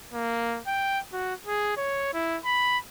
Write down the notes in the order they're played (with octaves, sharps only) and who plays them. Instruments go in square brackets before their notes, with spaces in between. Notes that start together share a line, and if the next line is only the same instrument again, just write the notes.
[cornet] A#3
G5
F#4
G#4
C#5
E4
B5